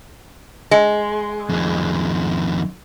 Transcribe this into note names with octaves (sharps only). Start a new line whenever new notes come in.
G#3
F2 D#3